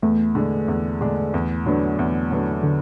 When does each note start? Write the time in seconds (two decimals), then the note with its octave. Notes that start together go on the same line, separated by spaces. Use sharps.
0.02 E2 A3
0.35 D3 G#3 D4
0.68 E2
1.01 D3 G#3 D4
1.34 E2
1.65 D3 F#3 B3 D4
1.99 E2
2.31 D3 F#3 B3 D4
2.63 D3